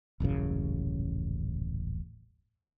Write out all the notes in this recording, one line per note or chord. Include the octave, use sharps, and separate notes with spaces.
D#1 A1 F#2 C#3